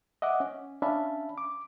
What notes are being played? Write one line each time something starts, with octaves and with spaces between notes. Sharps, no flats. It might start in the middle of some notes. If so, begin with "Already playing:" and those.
D#5 E5 F#5 D6
C#4
C#4 D4 E5 F5 A5 B5
D6